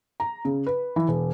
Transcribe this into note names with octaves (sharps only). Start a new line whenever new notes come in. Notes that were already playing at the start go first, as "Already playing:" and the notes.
A#5
C#3
B4
E3
E1